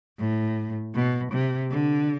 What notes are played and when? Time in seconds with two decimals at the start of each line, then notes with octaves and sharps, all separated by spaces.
0.19 A2
0.94 B2
1.32 C3
1.71 D3